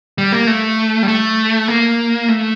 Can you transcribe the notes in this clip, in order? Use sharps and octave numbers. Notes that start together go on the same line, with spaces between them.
G3
A#3
A3
G3
A3
A#3
A3